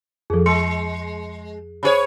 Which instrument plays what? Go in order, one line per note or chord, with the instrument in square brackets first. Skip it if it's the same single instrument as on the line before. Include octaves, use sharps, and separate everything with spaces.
[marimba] F2 F3 [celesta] G#4 A4
[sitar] G#3 [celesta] C6 C#7
[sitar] C#3 G#4 C#5 [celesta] C5 B5